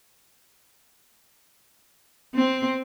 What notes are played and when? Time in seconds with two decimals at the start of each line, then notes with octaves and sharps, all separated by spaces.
2.35 C4